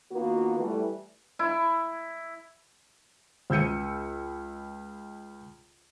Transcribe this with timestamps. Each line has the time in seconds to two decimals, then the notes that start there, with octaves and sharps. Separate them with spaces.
0.12 D#3 A#3 B3 F4 F#4
0.59 E3 G3 A3
1.39 E4
3.50 C#2 E6 G6 C#7 D#7